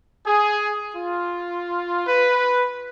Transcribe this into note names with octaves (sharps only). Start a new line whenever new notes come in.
G#4
F4
B4